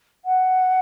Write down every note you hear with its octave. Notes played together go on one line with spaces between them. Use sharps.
F#5